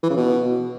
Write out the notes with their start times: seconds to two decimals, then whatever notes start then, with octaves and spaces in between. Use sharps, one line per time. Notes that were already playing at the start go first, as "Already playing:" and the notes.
0.03 E3
0.10 C#3
0.17 B2